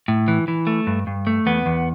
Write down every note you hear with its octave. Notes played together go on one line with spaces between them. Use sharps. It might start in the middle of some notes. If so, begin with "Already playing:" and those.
A2
E3
E3
A3
G2
G2
A3
E2 B3
E2